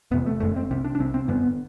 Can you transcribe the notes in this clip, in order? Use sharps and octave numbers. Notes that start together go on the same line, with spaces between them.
E1 E2 C3 B3
A3
F#1 F#2 D3 A3
C4
C2 C3 C4
D4
D4
C2 C3 C4
C4
G1 G2 D3 B3